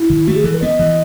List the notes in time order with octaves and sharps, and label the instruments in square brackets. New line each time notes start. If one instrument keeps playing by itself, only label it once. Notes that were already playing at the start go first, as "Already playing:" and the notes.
Already playing: [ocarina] E4
[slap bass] D#3
[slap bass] A3 [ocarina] F#4
[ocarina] G#4
[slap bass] E3 [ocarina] A4
[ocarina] B4
[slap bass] B3 [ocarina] D#5
[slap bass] E3